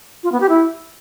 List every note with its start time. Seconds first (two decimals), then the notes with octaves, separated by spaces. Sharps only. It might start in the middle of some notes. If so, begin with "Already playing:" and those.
0.23 F4
0.32 B3
0.41 G4
0.49 E4